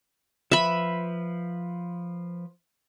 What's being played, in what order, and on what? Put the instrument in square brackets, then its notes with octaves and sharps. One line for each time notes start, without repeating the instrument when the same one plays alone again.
[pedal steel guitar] F3 B4 [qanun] E5 B5